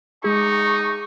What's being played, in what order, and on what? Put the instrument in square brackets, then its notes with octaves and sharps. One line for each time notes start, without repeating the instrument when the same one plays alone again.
[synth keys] G#3 D6 [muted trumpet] D#4 [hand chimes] G#4 [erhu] C#6